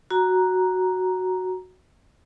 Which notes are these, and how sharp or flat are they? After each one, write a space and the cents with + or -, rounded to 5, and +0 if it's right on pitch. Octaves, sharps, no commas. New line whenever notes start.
F#4 +0 A#5 +5